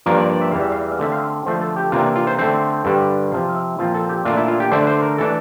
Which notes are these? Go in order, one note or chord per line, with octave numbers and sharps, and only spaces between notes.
G2 F3 A#3 D4 A#4
D5
D5
E5
E2 E3 G3 F5
E5
F5
E5
F5
D3 A3 C4 E5
F5
E5
D3 F3 A3 C5
A4
G4
C3 E3 A#3 D4 F4
F4
C5
D3 A3 C4 C5
G2 D3 G3 D4
C3 F3 C4 F5
F5
E5
A#2 F3 C4 F4
A4
G4
A#2 A3 D4 F4
E4
F4
G4
D3 A3 D4 C5
C5
A#4
E3 A3 D4 A4